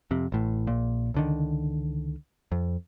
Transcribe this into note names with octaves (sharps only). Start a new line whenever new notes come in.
F2 C3
A1 A2
A#1 A#2
C#2 D3 D#3
F2